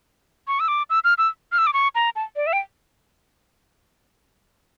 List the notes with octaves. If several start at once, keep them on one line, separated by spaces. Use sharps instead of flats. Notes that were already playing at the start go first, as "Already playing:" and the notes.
C#6
E6
D6
E6
F6
E6
F6
E6
D6
C#6
A#5
A5
D5
E5
G5